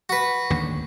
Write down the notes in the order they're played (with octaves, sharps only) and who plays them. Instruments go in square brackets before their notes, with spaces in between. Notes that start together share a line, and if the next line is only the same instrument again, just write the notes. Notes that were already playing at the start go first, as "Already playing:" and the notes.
[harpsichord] F#4 B4
[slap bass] A1 D#2 D3